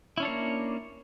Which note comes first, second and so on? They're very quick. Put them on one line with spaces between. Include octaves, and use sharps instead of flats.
E4 C#4 D4 C#5 A#3